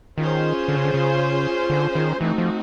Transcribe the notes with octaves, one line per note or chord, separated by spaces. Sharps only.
D#3 C#4 F4 G#4 C5
D3
C#3
D3
C#3
D3
D#3
E3 A3 C4 D#4 F#4
F3